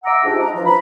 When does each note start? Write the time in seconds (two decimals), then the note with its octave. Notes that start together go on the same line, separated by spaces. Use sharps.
0.03 E5 F#5 A#5 D6 E6
0.24 G#2 D4 F4 G4
0.39 D#5 A#5
0.54 E3 F3 D4 F4
0.65 A#5 B5